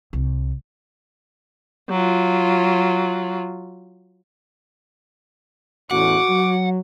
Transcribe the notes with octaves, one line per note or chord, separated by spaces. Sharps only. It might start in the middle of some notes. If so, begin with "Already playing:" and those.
C2
F#3 F4
A1 E2 F#4 F#5 D6
F#3